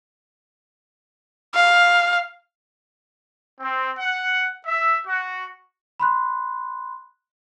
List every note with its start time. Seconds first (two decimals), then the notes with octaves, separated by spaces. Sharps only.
1.55 F5
3.60 C4
3.98 F#5
4.66 E5
5.06 F#4
6.00 B5 C6 F#6